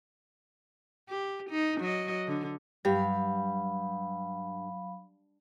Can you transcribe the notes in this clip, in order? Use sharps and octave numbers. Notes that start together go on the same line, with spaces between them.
G4
D#4
F#3 D#5
D3
G2 F#3 G4 F5 B5